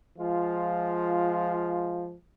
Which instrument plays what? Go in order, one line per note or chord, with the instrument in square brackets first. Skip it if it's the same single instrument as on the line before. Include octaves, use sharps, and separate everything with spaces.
[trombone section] F3 G#3 F4